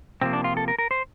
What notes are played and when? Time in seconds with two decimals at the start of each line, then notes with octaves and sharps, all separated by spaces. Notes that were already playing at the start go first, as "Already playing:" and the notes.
0.21 C3 F3 A#3 C4
0.33 D4
0.44 F4
0.57 A4
0.68 A#4
0.78 A#4
0.91 C5